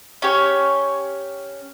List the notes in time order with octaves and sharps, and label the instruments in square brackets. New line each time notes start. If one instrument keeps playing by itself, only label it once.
[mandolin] C#4 G4 C#5